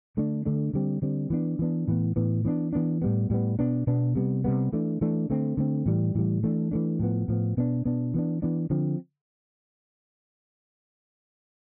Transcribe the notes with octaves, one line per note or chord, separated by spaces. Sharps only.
D3 A3 D4
D3 A3 D4
D3 G3 C4
D3 G3 C4
E3 B3 D4
E3 B3 D4
A2 E3 B3
A2 E3 B3
E3 B3 D4
E3 B3 D4
A2 G3 B3
A2 G3 B3
B2 B3 D4
B2 B3 D4
C3 G3 B3
C3 G3 B3
E3 A3 D4
E3 A3 D4
D3 A3 C4
D3 A3 C4
A2 E3 G3
A2 E3 G3
E3 A3 D4
E3 A3 D4
A2 F3 B3
A2 F3 B3
B2 B3 D4
B2 B3 D4
E3 B3 D4
E3 B3 D4
D3 F3 C4